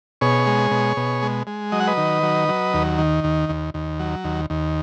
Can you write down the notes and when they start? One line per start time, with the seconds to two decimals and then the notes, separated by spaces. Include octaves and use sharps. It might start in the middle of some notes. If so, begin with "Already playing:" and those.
0.21 B2 G#4 C#5
0.47 G#3
0.71 B2
0.97 B2
1.22 G#3
1.47 G#3
1.72 F#3 D#5
1.80 F#5
1.87 B4 D#5
1.97 D#3
2.23 F#3
2.49 F#3
2.74 D#2
2.98 D#3
3.24 D#2
3.49 D#2
3.74 D#2
4.00 F#3
4.24 D#2
4.50 D#2